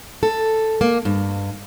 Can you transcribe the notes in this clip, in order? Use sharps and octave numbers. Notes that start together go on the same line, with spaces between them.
A4
A#3
G2